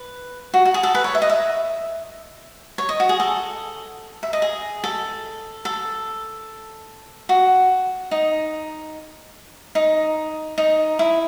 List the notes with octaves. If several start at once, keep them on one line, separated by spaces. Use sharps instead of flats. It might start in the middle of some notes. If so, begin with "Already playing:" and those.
Already playing: B4
F#4
F#4
G#4
A4
B4
C#5
E5
D#5
E5
C#5
D#5
F#4
G#4
A4
E5
D#5
G#4
A4
A4
F#4
D#4
D#4
D#4
E4